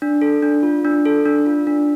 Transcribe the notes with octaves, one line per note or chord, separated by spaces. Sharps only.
D4
A4
D4
F4
D4
A4
D4
F4
D4